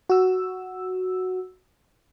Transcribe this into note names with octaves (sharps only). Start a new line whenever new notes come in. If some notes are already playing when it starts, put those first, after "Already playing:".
F#4 E6